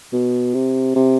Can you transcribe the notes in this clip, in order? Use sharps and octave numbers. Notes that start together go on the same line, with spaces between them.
B2
C3
C3